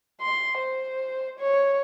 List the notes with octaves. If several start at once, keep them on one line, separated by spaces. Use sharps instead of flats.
C6
C5
C#5